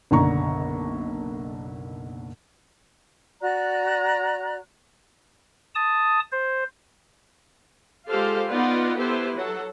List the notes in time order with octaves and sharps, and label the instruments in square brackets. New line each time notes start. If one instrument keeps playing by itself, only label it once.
[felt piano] F#1 B1 D3 D4 A#5 C#6
[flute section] F#4 D5 A#5 F#6
[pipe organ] A5 D#6
C5
[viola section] G#3 F4 G4 A4 C5 F5
B3 D#4 F4 B4 D5 F#5
B3 E4 G4 A4 B4 C5
F#3 A4 F#5